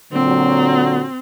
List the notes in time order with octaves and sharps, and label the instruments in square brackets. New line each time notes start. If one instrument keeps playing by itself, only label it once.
[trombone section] A#2 D3 F#3 [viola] C4